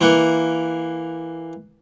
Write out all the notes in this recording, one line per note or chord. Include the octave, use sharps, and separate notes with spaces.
E3 A#3 F#5